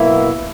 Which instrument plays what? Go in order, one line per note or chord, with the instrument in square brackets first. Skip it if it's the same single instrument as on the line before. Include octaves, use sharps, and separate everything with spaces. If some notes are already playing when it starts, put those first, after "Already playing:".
Already playing: [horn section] B2 F#3 A#3 E4